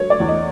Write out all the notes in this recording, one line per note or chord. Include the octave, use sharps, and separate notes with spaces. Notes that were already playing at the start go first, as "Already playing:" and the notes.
Already playing: F#3 C#5
D5
E2
D#5